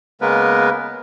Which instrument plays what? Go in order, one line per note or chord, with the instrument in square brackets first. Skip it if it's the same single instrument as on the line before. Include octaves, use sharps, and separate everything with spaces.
[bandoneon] C#3 G#3 A#3 B3 A#4 B4